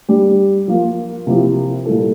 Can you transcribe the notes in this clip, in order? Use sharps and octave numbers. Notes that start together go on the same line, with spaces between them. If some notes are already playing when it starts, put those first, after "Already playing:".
G3 D4 G4
F3 A#3 F4
C3 F3 A#3 E4 G4
A#2 G3 A#3 E4 A4